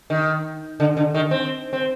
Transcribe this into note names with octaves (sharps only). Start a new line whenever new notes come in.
D#3
D3
D3
D#3
C4
C4